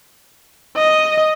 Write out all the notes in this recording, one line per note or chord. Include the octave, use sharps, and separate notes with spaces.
D#5